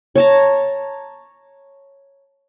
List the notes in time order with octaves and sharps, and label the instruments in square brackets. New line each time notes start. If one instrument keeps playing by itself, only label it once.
[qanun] C#5 A5 A#5